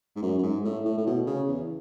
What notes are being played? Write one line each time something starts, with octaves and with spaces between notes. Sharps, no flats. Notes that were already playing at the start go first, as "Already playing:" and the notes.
G#2
F#2
F#2
G#2
A2
A2
A2
B2
C#3
E2